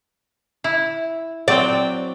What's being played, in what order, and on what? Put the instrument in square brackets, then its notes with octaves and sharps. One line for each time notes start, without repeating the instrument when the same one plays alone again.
[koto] E4
[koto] F#3 C4 G5 [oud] D5